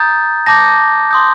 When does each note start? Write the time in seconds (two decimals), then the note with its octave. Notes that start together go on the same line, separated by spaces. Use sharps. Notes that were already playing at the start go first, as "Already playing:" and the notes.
Already playing: A#5 D#6 G6 A6
0.46 A5 D6 G6 A#6
1.11 C6 D#6 G6